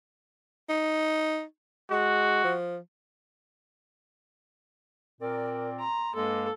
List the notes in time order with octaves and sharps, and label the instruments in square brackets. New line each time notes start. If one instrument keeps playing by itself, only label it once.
[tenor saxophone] D#4
[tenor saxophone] G#3 [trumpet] F#4
[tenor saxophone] F3
[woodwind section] A#2 C4 D5 [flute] A#4
[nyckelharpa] A#5 [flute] C6
[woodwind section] G2 G#3 A#3 [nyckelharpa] A4